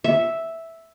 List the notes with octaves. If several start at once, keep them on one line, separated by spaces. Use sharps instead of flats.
E5